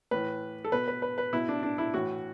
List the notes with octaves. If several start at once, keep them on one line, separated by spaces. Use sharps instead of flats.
A2 E3 B4
A4
B2 B4
B4
B4
B4
B2 E4
D4
D4
E4
A2 E3 F#4